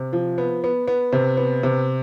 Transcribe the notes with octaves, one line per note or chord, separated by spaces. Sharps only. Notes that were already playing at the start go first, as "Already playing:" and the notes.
Already playing: C3
F3
B3
B3
B3
C3
B3
C3